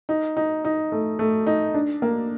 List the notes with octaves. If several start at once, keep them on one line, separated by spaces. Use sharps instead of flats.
D#4
D#4
D#4
A3
A3
D#4
D4
A#3